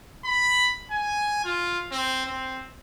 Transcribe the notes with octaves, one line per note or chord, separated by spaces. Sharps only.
B5
G#5
F4
C4
C4